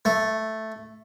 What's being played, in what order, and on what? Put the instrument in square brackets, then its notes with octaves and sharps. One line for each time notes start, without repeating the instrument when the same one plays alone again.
[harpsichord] A3